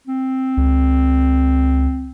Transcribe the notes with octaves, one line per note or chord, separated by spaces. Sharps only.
C4
C#2